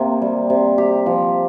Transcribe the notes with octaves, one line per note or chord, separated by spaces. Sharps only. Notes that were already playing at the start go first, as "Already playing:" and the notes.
Already playing: C3 A#3
G3
C3
G4
F3